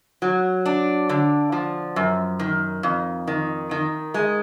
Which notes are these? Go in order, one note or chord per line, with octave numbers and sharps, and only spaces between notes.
F#3
D4
D3
F3
F#2
D#3
F2
D#3
D#3
G#3